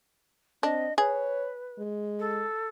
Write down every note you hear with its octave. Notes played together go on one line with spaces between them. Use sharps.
C4 D4 D#5
G#4 B4 C#5
G#3
A4